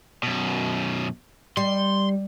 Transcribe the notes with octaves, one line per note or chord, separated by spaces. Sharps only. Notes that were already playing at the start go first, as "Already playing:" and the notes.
F#2 B2
G3 C6